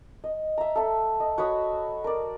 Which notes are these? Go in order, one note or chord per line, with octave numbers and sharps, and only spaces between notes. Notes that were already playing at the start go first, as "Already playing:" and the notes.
D#5
E5 A#5
A4 E5
D#5
F#4 C#5 B5 D#6
A#4 D5